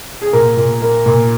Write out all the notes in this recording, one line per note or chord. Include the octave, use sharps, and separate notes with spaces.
G#4
A#2 A#4
A#2
A#3
A#2